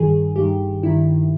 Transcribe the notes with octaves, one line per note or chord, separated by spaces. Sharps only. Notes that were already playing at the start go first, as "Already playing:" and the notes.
Already playing: G1 G2 D#3 G#4
G1 G2 D#3 G4
G1 G2 D#3 E4